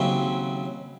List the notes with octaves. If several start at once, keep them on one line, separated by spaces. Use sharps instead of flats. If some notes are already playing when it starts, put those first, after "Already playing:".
Already playing: D#2 C#3 F#3 C4 E4